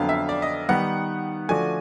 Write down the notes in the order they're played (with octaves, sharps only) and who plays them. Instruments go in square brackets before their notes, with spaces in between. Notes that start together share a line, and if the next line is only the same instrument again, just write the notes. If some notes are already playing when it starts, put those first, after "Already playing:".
Already playing: [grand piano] F2 D3 F#3 B3 [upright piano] F5
[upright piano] E5
D5
D#5
[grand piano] D#3 G3 B3 D#4 [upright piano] F#5
[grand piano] D3 F3 A3 D4 F#4 [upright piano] G#5